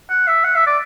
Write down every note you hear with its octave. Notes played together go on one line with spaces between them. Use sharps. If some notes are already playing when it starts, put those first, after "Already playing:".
F#5
E5
F#5
E5
D5